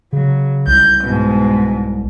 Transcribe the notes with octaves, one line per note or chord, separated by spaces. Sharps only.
C#3 F#3
C2 G6
G#2 B2